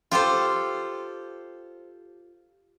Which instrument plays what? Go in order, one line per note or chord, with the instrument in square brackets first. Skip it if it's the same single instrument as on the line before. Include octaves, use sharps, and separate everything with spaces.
[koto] F4 G4 A4 C5